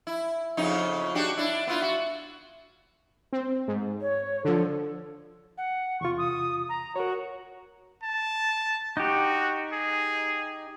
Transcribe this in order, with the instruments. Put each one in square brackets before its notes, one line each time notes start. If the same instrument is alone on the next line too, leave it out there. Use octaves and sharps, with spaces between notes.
[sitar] E4
F2 C#3 D#4
D4 F#4 G4
D4 E4
B3 E4 F4
F#4
[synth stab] C4
G#2
[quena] C#5
[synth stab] D3 F3 [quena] A4
[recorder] F#5
[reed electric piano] E2 C3 F4 [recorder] C#6
[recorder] D#6
A#5
[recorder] F#4 [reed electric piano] A#4 C#5
[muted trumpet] A5
[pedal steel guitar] D#4 G4 [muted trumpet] F#4
[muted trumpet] G#4